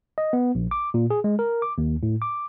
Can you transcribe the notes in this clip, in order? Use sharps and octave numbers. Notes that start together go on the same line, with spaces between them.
D#5
B3
A#1
D6
A#2
G#4
G#3
A#4
D6
D#2
A2
D6